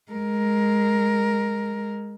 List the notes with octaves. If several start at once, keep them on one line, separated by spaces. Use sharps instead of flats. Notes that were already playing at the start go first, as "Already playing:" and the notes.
G#3 A#4